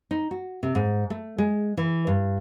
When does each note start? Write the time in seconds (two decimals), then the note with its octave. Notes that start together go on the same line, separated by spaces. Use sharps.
0.11 D#4
0.31 F#4
0.63 C3
0.75 G#2
1.10 A3
1.38 G#3
1.77 E3
2.07 G2